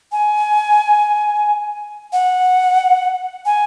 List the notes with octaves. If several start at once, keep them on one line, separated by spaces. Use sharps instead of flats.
G#5
F#5
G#5